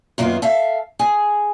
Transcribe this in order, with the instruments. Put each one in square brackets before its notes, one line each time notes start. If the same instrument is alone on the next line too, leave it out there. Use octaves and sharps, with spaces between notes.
[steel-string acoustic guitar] F#2 D#3 A#3 B3 F4
A4 E5 F5
G#4